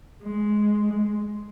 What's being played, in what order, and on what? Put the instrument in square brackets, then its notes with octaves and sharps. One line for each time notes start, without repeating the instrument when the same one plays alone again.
[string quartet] G#3